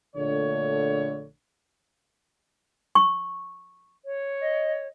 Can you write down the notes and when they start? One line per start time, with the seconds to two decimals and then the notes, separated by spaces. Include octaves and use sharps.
0.16 A#1 D3 A3 C#5
2.95 C#6
4.05 C#5
4.41 D#5